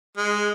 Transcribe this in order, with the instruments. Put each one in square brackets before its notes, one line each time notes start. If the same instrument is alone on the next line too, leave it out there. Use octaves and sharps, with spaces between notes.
[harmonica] G#3